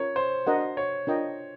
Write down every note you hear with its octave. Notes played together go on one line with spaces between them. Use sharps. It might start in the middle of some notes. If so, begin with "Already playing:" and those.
Already playing: C#4 F4 A#4 C#5
C5
D4 F#4 A#4 D#5 F#5
C#5
D4 F4 A#4 D#5 G5